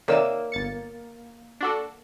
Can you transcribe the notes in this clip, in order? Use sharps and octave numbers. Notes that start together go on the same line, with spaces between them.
C3 D#3 A#3 C#5 D5 E5 E6
G1 A6 C#7
D4 F#4 A4